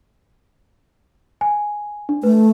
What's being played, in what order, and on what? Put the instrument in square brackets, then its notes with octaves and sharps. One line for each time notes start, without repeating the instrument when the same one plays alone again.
[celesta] G#5
D4
[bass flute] A3 [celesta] B4